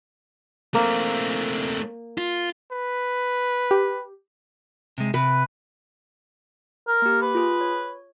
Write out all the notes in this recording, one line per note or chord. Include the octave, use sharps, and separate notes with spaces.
A3 A#3 C4
F4
B4
G4
C3 G#3
C3 B4
A#4
A#3 G4
B4
F4 G#4
C#5